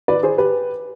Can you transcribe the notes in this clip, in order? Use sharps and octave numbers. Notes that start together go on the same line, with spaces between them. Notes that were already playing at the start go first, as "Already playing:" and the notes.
B4 D5
G#4 C5
G4 B4